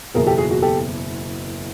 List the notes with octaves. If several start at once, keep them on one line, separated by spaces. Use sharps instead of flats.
F#1 E2 B2 G#4 A#4
G4 A4
F#4 G#4
F#4 G#4
G4 A4